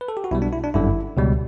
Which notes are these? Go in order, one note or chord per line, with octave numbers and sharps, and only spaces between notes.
B4
A4
G4
F#4
B1 B2 G3 E4
D4
E4
D4
G1 F#2 D3 G3 E4
C#2 B2 G3